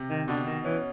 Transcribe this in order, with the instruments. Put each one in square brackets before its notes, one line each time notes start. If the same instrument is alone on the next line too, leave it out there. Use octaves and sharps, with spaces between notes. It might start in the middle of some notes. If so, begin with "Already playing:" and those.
Already playing: [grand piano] C3
[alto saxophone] D#3
[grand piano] B2 [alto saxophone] D3
[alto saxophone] D#3
[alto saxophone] E3 [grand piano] C#4